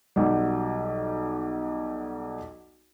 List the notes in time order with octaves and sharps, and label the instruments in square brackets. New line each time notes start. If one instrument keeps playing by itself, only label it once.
[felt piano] B1 F#3 G3